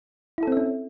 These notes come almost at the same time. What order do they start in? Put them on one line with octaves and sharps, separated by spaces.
E4 A4 C4 E5 C#4